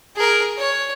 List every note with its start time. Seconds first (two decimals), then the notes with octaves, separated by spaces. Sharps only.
0.16 G#4 A#4
0.58 C#5